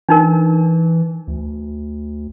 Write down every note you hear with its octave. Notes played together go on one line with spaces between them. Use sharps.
E3 D4 D#4 A#4
D2